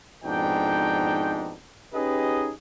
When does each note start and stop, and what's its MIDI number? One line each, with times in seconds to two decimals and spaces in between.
0.24 1.57 41
0.24 1.57 44
0.24 1.57 47
0.24 1.57 62
0.24 1.57 63
0.24 1.57 79
1.94 2.52 61
1.94 2.52 63
1.94 2.52 67
1.94 2.52 68
1.94 2.52 71
1.94 2.52 75